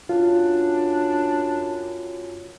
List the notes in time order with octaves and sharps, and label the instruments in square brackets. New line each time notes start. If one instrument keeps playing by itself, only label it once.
[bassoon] F#2 [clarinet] D4 [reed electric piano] F4